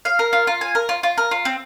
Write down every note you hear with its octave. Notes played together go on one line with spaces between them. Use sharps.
F5
A#4
F4
F4
G#5
A#4
F4
F4
A#4
F4
C4